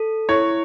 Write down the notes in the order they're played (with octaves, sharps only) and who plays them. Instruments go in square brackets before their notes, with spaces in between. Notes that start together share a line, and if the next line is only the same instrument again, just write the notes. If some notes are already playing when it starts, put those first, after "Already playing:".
Already playing: [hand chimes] A4
[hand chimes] E4 [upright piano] C#5